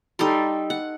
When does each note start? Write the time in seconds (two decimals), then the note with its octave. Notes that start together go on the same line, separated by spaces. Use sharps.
0.19 G3 D#4 A4 C6
0.70 F#5